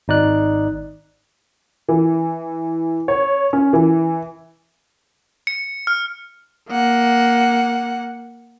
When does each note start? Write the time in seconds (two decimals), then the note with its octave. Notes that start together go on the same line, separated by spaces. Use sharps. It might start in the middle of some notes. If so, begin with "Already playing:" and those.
0.08 G#1 D#4 D5 F#6
1.88 E3
3.08 C#5
3.53 C#4
3.73 E3
5.47 C#7
5.87 F6
6.69 A#3 F#5